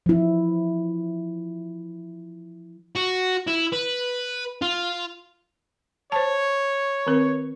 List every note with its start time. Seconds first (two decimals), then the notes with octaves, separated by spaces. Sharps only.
0.06 F3 E4
2.95 F#4
3.47 E4
3.73 B4
4.62 F4
6.12 C5 C#5 A5
7.07 D#3 C4 A#4